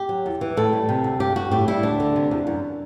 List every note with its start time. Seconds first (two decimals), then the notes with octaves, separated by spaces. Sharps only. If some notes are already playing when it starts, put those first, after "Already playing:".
Already playing: G4
0.09 F#3
0.26 E2
0.41 E3
0.57 A2 A4
0.73 G3
0.89 C3
1.04 D2
1.20 G2 G4
1.36 G2 F#4
1.51 A2 G4
1.68 G3 E4
1.83 D2 D4
2.00 D3
2.16 C3
2.31 E2
2.47 F#2